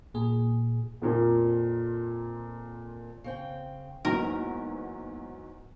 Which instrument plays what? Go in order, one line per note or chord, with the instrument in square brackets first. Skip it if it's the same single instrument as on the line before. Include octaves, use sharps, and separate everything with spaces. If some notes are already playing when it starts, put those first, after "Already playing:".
[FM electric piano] A#2 G#4
[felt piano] F2 A#2 A#3
[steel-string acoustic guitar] C#3 C4 G5
[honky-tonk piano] E2 G#2 F#3 [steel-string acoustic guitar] A#3 B4 [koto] A#4